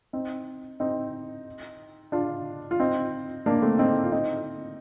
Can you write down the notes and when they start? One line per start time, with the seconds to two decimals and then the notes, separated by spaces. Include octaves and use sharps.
0.13 C4 D#4
0.80 C4 D#4
2.12 D4 F4
2.71 F4
2.80 C4 D#4
3.46 A#3 D4
3.62 A3 C4
3.79 C4 D#4
4.04 F4
4.12 C4 D#4